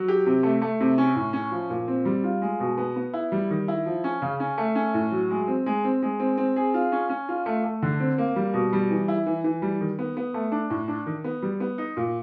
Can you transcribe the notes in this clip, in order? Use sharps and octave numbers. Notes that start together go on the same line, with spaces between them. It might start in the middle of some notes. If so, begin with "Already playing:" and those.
Already playing: F#3
G4
C3
A3
A3
C3
C#4
A2
C#4
F3
A#2
C4
G3
F4
G#3
B2
B3
B3
E4
G3
D#3
E4
F3
C#4
C#3
C#4
A3
C#4
A2
F#3
G#3
C4
G#3
C4
G#3
C4
C4
G#4
F4
C#4
C#4
F4
A3
A3
D3
C4
A#3
G3
B2
G3
E3
E4
E3
E3
G3
D#3
B3
B3
A3
D4
A2
D4
D#3
B3
G3
B3
D#4
A#2